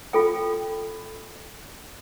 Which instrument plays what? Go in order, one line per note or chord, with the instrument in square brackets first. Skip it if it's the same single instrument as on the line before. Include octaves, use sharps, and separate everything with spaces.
[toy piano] F4 A4 G5